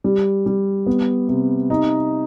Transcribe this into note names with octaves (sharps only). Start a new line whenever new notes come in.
G3
G3
B3
C3
D#4